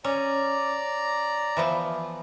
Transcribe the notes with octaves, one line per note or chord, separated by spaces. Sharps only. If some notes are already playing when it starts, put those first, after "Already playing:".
C#4 D5 A#5
E3 F3 B3